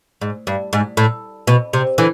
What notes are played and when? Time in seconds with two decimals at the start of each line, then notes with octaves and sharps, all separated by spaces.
0.22 G#2
0.47 G2
0.73 G#2
0.97 A2
1.47 B2
1.73 C3
1.98 D3 E3